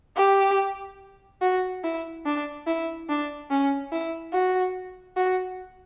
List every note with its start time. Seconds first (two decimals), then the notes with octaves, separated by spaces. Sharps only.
0.16 G4
1.42 F#4
1.84 E4
2.25 D4
2.67 E4
3.09 D4
3.50 C#4
3.92 E4
4.33 F#4
5.16 F#4